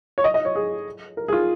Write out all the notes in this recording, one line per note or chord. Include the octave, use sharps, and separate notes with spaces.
C#5
D#5
D#5
C#5
G#4
A#4
G#4
F4